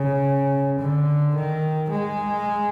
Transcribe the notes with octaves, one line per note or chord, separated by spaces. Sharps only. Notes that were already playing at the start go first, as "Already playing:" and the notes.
Already playing: C#3
D3
D#3
G#3